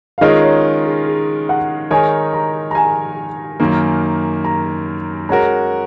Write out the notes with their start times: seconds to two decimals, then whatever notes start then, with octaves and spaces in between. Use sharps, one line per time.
0.18 F5
0.21 D#3 G#3 C#4 F4 A#4 D#5
0.43 C#5
0.85 G#4
1.06 G#4
1.49 F#5
1.91 D#3 G#3 D#4 A#4 C#5 G#5
2.34 A#5
2.71 A#5
2.75 G#5
3.60 F#2 D#3 A#3
4.44 A#5
5.29 G#3 C#4 F#4 A#4 A#5